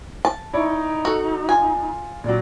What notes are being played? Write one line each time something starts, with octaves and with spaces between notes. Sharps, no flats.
A5
D#4 E4 C#5 D5
F#4 A4
F4 G#5
A#2 F#3 D5